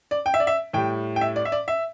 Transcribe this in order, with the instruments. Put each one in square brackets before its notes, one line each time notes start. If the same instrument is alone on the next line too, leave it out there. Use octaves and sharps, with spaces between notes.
[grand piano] D5
G5
E5
D5
E5
A2 G3 G5
G5
E5
D5
E5
D5
E5